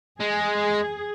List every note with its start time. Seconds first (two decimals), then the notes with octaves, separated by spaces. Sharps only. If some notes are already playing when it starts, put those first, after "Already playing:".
0.20 G#3 G#4